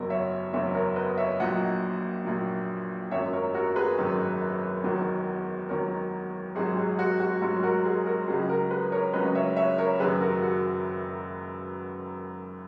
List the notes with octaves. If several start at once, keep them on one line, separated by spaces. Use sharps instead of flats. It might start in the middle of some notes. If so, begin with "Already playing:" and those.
Already playing: F#1 E2 B2 F#3 A#4
C#5 E5
F#1 E2 B2 F#3 C#5 E5
A#4 C#5
B4 D#5
C#5 E5
A#1 A#2 F#3 D#5 F#5
A#1 A#2 F#3
G#1 F#2 D#3 F#3 C#5 E5
A#4 C#5
F#4 A#4
G#4 B4
G#1 F#2 D#3 F#3
E1 E2 D#3 F#3
E1 E2 D#3 F#3 A#4 C#5
G#1 G#2 F#3 G#4
G#4
F#4
F#4
G#1 G#2 F#3 F#4
F#4 A#4
G#4
F#4 A#4
C#2 C#3 F#3 G#4
F#4 A#4
G#4 B4
A#4 C#5
C#2 C#3 F#3 B4 D#5
C#5 E5
C#5 E5
A#4 C#5
F#1 F#2 D#3 G#4 B4
F#4 A#4
F#4